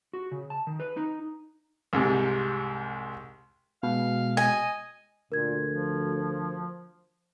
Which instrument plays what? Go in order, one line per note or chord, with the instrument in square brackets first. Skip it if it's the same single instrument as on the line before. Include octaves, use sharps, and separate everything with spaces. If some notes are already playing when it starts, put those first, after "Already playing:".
[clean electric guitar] F#4
C#3
A5
D#3
B4
D#4
[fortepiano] C2 G#2 C3
[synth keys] B2 [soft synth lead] G#3 [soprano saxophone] F5
[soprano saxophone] D#5 [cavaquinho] G#5
[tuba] D2 [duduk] A#2 [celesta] A#4 G#6
[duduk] F3